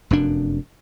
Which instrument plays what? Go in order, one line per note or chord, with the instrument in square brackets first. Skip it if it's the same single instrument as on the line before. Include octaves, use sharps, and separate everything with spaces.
[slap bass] F1 F#2 D4